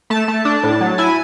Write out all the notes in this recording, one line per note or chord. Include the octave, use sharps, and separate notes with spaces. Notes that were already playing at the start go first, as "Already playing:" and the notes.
A3 A5
A3
D4
A2
F#3
E4 G#5